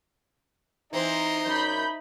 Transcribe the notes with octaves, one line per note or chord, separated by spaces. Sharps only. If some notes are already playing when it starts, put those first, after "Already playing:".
E3 C4 D#4 A#5 C6
F#2 B5 G6